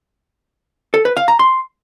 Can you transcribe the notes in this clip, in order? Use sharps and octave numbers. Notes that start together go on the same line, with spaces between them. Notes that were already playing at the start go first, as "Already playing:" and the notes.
A4
B4
F5
A#5
C6